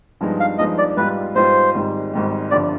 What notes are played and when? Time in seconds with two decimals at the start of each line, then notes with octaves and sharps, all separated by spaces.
0.21 G2 F3 G#3 B3 D#4
0.40 F5
0.59 G2 F3 G#3 B3 D#4 D#5
0.78 D5
0.97 G#2 G3 B3 F4 B4
1.36 G#2 G3 B3 F4 C5
1.74 G#1 G#2 G3
2.13 G#1 G#2 G3
2.51 G1 G2 D3 F3 D5